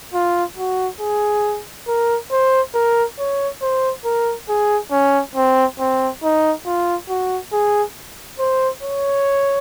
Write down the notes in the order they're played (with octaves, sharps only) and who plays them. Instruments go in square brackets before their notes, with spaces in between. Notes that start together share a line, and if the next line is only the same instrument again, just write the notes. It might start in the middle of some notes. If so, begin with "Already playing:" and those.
[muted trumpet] F4
F#4
G#4
A#4
C5
A#4
C#5
C5
A#4
G#4
C#4
C4
C4
D#4
F4
F#4
G#4
C5
C#5